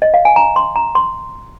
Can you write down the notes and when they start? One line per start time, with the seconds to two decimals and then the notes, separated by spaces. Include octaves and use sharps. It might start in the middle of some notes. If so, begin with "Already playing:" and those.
0.02 D#5
0.14 F5
0.25 G#5
0.36 A#5
0.56 C6
0.76 A#5
0.95 C6